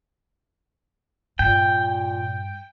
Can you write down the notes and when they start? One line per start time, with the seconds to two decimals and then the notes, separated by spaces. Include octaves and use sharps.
1.39 G2 A#2 G5